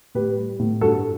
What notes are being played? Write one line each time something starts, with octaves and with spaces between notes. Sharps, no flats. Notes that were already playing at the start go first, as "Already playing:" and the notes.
A2 G4 B4
G3
A2
G2 F#4 A4